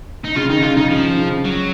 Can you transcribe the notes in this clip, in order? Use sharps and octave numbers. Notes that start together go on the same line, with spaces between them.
D#4
C#3 F4
D#3 D#4
C#3 F4
C#3 D#4
F3
C#3
F#3